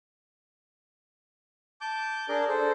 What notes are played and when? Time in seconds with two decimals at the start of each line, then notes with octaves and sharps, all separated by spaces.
1.81 A5 D6 G6
2.29 D4 G#4 A#4 D5
2.48 A4 C5